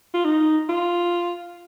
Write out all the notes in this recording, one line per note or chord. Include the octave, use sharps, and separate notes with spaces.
F4
D#4
F4